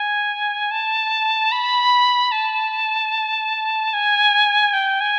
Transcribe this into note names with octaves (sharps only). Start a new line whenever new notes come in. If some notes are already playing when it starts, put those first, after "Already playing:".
Already playing: G#5
A5
B5
A5
G#5
G5
G#5